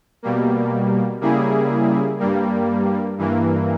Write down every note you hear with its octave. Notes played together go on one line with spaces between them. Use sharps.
B2 G3 A#3
C#3 G3 A#3 E4 G#4
G2 G3 A#3
G2 E3 A#3